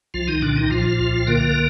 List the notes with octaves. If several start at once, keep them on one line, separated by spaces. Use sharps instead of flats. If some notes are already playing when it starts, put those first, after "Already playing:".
C2 F3 F4
D#3 D#4
A#2 D3 D4
D#3 D#4
A#2 F3 F4
C2
D3 A#3 A#4